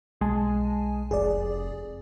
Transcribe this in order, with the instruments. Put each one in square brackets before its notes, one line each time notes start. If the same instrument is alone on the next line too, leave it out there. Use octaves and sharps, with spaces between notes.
[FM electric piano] B1 G#5 A5 [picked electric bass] G#3
[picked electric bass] F1 [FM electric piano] G#4 D5